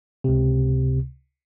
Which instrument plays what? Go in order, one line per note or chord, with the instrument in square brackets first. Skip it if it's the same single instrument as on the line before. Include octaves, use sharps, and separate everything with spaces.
[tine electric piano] C#2 C3